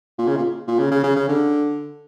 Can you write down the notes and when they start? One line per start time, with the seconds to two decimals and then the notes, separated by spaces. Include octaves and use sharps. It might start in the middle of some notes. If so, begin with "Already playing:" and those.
0.18 A#2
0.28 C#3
0.36 A#2
0.68 A#2
0.79 C#3
0.91 C#3
1.04 C#3
1.16 C#3
1.29 D3